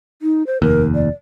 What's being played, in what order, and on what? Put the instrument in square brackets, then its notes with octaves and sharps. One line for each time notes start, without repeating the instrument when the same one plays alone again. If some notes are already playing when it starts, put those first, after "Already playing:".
[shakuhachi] D#4
C5
[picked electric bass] F1 D#2 [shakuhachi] A#4
[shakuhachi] D5